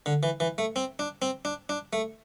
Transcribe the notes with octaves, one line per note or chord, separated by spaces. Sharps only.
D3
E3
E3
A3
C4
D4
C4
D4
D4
A3